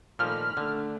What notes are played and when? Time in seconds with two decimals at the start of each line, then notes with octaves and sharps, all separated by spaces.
0.19 A#2 D#3 F3 A3 B5 F6
0.57 D3 A3 D4